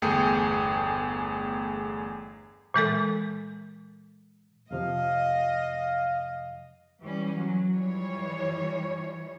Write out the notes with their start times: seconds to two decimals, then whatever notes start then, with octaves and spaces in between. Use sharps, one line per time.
0.02 G1 E2 A3 G#4 G5 C#7
2.74 A#2 E3 G#3 A4
4.71 F2 C3 F3 D#5 F5
7.03 E3 G3 C#4
7.36 F#3
7.74 E3 F3 G3 C#5